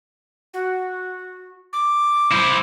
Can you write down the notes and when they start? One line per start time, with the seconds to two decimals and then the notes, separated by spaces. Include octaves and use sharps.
0.54 F#4
1.73 D6
2.32 E4 C5